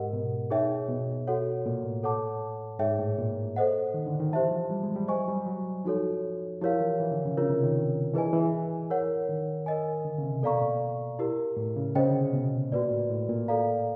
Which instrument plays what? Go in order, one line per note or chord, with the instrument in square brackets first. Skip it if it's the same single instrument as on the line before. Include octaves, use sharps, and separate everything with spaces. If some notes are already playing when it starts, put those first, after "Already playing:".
Already playing: [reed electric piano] G#2 [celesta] G4 A#4 D#5 F#5
[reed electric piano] B2
[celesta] D#4 G#4 C#5 E5 G5
[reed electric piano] B2
[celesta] F#4 A4 C#5 F#5
[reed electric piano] A#2
A2
[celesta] A4 C#5 F#5 A5 D6
[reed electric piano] G#2 [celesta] D#4 G#4 C#5 E5 G5
[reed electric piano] A2
A#2
[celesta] A4 C5 D#5 F#5
[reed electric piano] D#3
D3
D#3
[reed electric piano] E3 [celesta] G4 C5 E5 A5
[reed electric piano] F3
G3
G#3
G3
[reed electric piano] F#3 [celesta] C5 D#5 G#5 C#6
[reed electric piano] G3
F#3
[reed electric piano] F3 [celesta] D#4 F#4 A4 C#5
[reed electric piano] F3 [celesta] E4 G4 A#4 C#5 F5
[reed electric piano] E3
E3
D3
C#3
[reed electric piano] C#3 [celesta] D4 F4 A#4 C#5
[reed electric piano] C3
D#3
[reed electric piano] E3 [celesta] E4 G#4 B4 D#5 G#5
[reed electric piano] E3
[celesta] A#4 C#5 F#5
[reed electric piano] D#3
[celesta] A#4 D#5 G#5
[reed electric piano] D3
C#3
C3
[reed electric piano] B2 [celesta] A4 D5 F5 A#5 C#6
[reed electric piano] A#2
[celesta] E4 G4 A#4
[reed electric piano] A2
C#3
[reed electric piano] C#3 [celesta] C5 D#5 G5
[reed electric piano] D3
C3
B2
[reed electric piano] A#2 [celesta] F#4 B4 D5
[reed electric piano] A2
A2
A#2
[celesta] A4 D5 F5 A#5